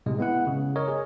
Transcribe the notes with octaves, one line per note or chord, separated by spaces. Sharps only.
A2 C3 G#3
G#3 B3 E4 F#5
C#3
A#4 C#5 D#5
G#4